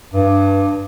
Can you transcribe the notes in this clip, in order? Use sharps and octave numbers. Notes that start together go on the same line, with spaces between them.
G2